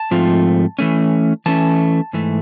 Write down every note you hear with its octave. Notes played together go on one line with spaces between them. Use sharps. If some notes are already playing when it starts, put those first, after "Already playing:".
Already playing: A5
G#2 F3 A3 C4 F4
E3 A3 C#4
E3 A3 C#4 A5
G#2 E3 A3